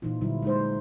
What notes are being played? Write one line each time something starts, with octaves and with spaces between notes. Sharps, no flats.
A#2 E3 D#4 F4
A#2 D3 F#3 G3 E4 F4
G#3 D#4 C5